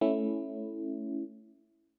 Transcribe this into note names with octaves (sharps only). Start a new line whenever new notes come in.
A3 C#4 E4